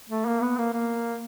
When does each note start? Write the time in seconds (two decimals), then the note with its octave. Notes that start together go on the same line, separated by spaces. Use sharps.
0.09 A3
0.26 A#3
0.42 B3
0.58 A#3
0.73 A#3